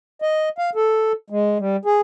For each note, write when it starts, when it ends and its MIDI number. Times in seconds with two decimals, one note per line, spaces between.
0.22 0.49 75
0.58 0.70 77
0.75 1.12 69
1.30 1.58 56
1.59 1.76 55
1.85 2.01 68